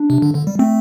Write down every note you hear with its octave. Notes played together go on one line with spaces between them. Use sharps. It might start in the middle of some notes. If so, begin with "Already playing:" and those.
Already playing: D4
C3
D3
D3
G3
A3 C4